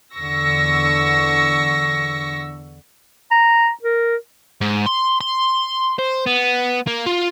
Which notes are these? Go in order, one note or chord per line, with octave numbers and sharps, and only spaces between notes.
E2 D3 C#6 E6 A#6
A#5
A#4
G#2
C6
C6
C5
B3
A#3
F4